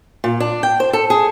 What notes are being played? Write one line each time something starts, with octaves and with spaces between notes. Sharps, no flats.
A#2
D4
G5
C5
A4
G#4